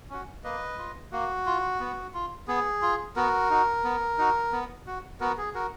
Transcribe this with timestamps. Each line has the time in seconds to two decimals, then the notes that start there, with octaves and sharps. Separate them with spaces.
0.10 C#4 F#4
0.44 A#3 B4 D#5
0.78 F4
1.12 A#3 F#4
1.46 F4
1.80 B3
2.14 F4
2.48 B3 G#4
2.82 F4
3.16 B3 F#4 A#4
3.50 D#4 F#4
3.84 B3
4.18 D#4 F#4
4.53 B3
4.87 F#4
5.20 B3 F#4 A#4
5.38 G#4
5.54 F#4 A#4